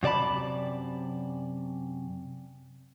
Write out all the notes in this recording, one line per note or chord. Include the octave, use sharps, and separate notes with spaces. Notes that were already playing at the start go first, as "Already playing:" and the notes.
F#2 C3 D5 A5 B5